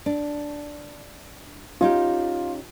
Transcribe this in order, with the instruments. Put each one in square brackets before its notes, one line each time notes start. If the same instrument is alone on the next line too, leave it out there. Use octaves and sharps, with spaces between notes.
[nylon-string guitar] D4
[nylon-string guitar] C#4 D#4 G4 [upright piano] F4